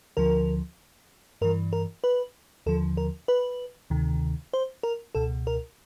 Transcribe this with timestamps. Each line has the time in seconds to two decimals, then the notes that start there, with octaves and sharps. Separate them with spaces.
0.17 D2 D3 F3 A#4
1.41 G2 E3 A#4
1.73 A#4
2.04 B4
2.66 D#2 D3 F3 A4
2.97 A#4
3.28 B4
3.90 D2 C3 D#3
4.53 C5
4.83 A#4
5.15 C#2 B2 A4
5.47 A#4